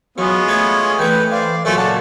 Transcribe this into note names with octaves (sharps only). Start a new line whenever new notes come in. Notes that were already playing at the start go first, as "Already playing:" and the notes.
F#2 G#3 B3 C#4 F4
A3 B4 G#6
E3 A3 B4 G5
C5 D5 F5
F#2 A#2 C#3 A3 C5 C#5 G#5
C#4 F#4 D5 A5